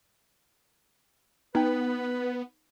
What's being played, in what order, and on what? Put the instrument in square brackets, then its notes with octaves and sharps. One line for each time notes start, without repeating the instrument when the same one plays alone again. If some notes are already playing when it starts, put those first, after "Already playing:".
[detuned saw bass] B3 [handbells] D#4 G5 [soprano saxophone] B4